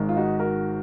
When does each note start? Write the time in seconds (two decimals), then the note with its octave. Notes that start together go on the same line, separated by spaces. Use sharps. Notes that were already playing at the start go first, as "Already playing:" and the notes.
Already playing: G#1 G#2 D#3
0.09 F4
0.17 D#4 F#4
0.39 F#4 A#4